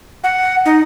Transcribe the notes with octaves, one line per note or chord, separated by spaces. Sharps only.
F#5
D#4